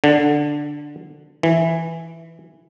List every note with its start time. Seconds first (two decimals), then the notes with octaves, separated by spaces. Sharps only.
0.04 D3
1.43 E3